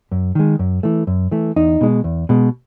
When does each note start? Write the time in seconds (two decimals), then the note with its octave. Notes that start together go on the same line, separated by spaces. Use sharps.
0.12 F#2
0.35 D#3 G#3
0.59 F#2
0.83 E3 A3
1.07 F#2
1.32 E3 A3
1.56 E2 D#4
1.81 B2 G#3
2.04 E2
2.29 B2 G#3